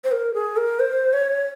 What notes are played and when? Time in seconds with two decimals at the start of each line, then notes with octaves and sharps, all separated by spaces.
0.04 C5
0.12 A#4
0.34 G#4
0.57 A#4
0.80 C5
1.13 C#5